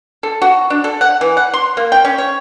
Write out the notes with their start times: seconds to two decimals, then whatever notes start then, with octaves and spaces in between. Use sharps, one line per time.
0.23 A4
0.42 F#4
0.70 D4
0.84 A4
1.01 F#5
1.21 E3
1.37 F#5
1.54 C6
1.77 A#3
1.92 G5
2.05 C#4
2.18 C#5